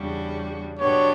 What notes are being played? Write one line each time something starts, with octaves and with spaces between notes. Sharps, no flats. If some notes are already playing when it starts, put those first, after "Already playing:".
Already playing: E2 C#3 G3 D4 F#4
B2 F#3 B3 D4 G4 C#5